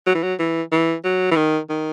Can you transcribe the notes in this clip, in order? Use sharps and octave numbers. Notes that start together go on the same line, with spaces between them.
F#3
E3
F#3
E3
E3
F#3
E3
D#3
D#3